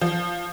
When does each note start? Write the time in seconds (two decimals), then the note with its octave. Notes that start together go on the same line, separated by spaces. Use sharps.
0.01 F3